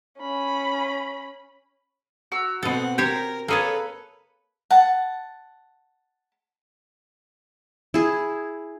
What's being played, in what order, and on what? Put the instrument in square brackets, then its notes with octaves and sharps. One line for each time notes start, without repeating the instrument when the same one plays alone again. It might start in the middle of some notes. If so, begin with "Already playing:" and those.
[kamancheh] C#4 B5
[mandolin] F#4 A#5 E6
[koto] B2 A4 [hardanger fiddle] C4 F#5
[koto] G4 C5 C#5 [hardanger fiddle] A#4
[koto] A#3 G#4 A5 [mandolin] A4 C#5 [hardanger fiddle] B4
[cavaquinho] F#5 A5
[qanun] E4 G#4